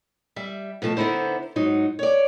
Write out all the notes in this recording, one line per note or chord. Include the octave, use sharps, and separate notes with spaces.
G3 E5
B2 F3 A3 A5
D3 B3 D#4 E4 C5
G#2 F#3 D#4 F#4
C#5 D5